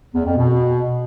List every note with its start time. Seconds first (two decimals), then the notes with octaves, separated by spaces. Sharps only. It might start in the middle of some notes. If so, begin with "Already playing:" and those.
0.14 E2
0.25 F2
0.37 B2